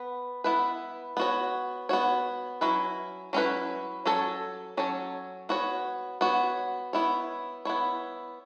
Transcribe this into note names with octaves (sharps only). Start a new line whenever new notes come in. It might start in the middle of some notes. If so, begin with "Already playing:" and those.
Already playing: B3 B4
B3 E4 B4
B3 F#4 C#5
B3 F#4 C#5
F#3 C#4 E4 B4
F#3 C#4 E4 B4
F#3 C#4 A4 C#5
F#3 C#4 A4 C#5
B3 F#4 C#5
B3 F#4 C#5
B3 E4 C#5
B3 E4 C#5